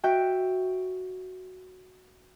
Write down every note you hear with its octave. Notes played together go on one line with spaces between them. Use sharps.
F#4 E5 G5